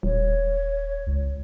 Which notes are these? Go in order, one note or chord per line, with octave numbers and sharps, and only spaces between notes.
D#1 C#5
C#2